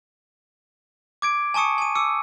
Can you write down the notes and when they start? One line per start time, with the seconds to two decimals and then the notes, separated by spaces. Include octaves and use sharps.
1.22 D6 G#6 D7
1.54 G#5 A5 C#6 D#6 C#7
1.78 G#5 D#7
1.96 D6 E6 C#7